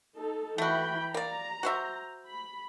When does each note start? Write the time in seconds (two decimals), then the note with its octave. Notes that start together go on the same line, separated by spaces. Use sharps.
0.15 D#4 A4
0.58 E3 A3 F#4 G5 B5
1.14 A#3 D5 A#5
1.63 F#4 C5 E5
2.28 B5